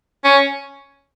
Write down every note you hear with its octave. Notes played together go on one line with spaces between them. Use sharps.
C#4